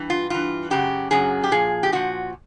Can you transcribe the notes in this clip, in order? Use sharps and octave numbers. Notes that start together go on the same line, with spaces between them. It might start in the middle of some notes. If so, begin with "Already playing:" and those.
Already playing: G2 E3
F4
G2 E3 F4
F#2 C#3 F#3 G4
F#2 C#3 F#3 G#4
G4
A#2 F3 G#4
G4
A#2 F3 F#4